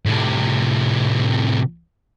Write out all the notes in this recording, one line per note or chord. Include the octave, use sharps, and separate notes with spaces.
A2 C3